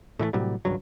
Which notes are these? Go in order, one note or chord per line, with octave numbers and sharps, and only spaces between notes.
A2 E3 F#3 A3
A2 C3 F#3 G3
G#1 C#2 G2 F#3